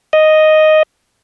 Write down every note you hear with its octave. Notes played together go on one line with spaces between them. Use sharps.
D#5